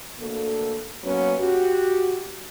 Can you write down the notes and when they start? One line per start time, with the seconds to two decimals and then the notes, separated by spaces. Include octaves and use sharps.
0.19 D2 A#3 A4
1.03 F#3 A#3 B3 C#4
1.39 F#4 G4